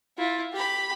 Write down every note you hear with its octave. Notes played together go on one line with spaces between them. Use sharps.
E4 F4
G4 B5